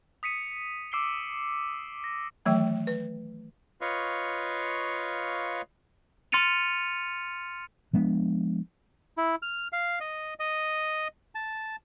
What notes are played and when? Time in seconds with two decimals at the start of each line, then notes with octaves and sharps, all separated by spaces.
0.23 D#6 B6 C#7 D#7
0.92 D6 E6 C7 D7 G7
2.04 A#6
2.46 D#3 E3 F#3 A3 G5
2.87 B4
3.81 F4 B4 C#5 D#5 F5 C#6
6.32 C6 F6 A6 C#7 D#7 F7
7.93 F3 G#3 B3 D4
9.18 E4
9.42 F6
9.73 F5
10.00 D#5
10.40 D#5
11.35 A5